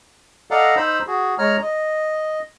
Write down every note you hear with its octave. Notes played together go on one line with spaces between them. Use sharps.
A4 D5 D#5 F5 F#5 A#5
D#4 C5 B5 E6
F#4 G#4
G#3 C#5 A#5 F6
D#5